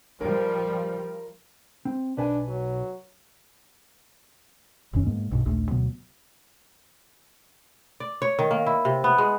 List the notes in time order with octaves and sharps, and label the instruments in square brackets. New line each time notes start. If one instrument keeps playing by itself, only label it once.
[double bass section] F3 G3 [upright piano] A#4
[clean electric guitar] C4
[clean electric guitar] B1 B4 G#5 [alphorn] D4
[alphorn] F#3
[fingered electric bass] F1 F#2 D#3 C#4
G#2 G#3 A#3 B3
B1 G2 B2
A#1 D#2 A3
D2 B2 F#3 B3
[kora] D5
C#5
D#3
A#3
E4
C3
B3
G#3